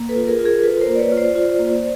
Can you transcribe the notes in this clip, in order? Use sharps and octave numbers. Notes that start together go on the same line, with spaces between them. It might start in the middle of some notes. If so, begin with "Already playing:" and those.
Already playing: A#3
A4 B4
F4
G#4 A#4
F4
G#4 A#4
F4 A4 B4
A#4 C5
A#3
D5
B4 C#5
F4
C5 D5
F4
A#3